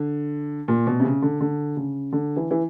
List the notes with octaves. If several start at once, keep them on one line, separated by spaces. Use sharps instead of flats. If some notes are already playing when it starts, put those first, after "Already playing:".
Already playing: D3
A#2
B2
C3
C#3
D3
D3
C#3
D3
E3
E3